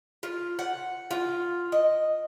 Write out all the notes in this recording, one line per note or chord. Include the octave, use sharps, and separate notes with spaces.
F4
F#5
F4
D#5